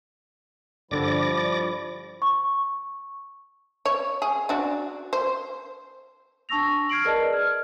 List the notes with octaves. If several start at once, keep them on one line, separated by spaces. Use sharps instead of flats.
G2 D3 F3 G3 E4 D5 D6 A#6
C#6
C#5
G#4
D4 F#4 D5
C5
D4 A5 C#6 E6 A#6 F7
F6 G#6 C7 D7 F#7
G#4 A#4 B4 D5 D#5 A5
F6 G#6